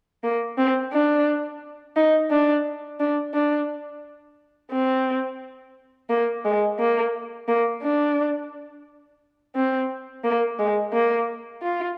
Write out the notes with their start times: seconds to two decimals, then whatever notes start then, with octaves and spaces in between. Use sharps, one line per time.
0.24 A#3
0.58 C4
0.93 D4
1.96 D#4
2.31 D4
3.00 D4
3.34 D4
4.73 C4
6.10 A#3
6.45 G#3
6.79 A#3
7.48 A#3
7.83 D4
9.56 C4
10.24 A#3
10.59 G#3
10.93 A#3
11.63 F4